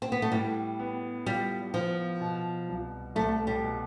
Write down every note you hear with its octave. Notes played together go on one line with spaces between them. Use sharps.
C4
B3
A3
A2 G3
B3
G3 F4
F3 B3
B2
C2
C2 A3
G3
B2